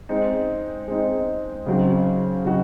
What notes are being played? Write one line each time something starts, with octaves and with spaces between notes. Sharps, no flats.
G#3 C4 D#4
G#3 C4 D#4
C#3 F#3 C4 D#4 F#4
C#3 F#3 C4 D#4 F#4